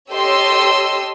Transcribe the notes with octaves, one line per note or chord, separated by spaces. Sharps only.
G4 A4 C#5 D#5 C6 E6